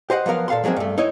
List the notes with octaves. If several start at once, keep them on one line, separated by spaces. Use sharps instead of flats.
G4 C5 D#5 F#5
F3 F#3 B3 A#4 F5
A#2 A4 F5 F#5 C6
F3 F#3 G#3 A#3 C4
G2 A3
D#4 E4 C#5 D#5